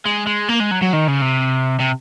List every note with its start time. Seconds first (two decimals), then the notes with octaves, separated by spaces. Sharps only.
0.05 G#3
0.27 G#3
0.48 A#3
0.60 G#3
0.71 F#3
0.82 F#3
0.93 D#3
1.07 C#3
1.21 C3
1.80 C3